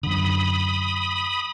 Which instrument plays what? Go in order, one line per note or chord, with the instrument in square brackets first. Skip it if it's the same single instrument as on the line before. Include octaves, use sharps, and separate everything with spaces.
[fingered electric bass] F#2 D3 [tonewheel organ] B5 D#6